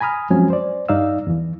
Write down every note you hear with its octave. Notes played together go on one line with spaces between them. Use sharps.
G#5 A#5 B5 D#6 F6
F3 F#3 G#3 C4 C#4 G#5
C5 D5
G2 D#4 D5 F5 E6
E2 E3